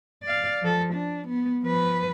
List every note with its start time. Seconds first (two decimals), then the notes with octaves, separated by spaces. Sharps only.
0.23 D5 F5
0.62 F3 A4
0.94 D4
1.28 B3
1.63 F3 B4